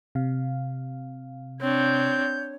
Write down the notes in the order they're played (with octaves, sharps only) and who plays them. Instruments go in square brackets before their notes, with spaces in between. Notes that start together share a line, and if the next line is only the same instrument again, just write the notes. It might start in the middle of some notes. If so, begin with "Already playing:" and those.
[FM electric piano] C3 F5
[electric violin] C4 D4 [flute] C#5 [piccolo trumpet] G6